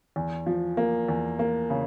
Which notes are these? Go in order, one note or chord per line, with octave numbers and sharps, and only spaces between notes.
E2
F3
A#3
E2
A#3
C#3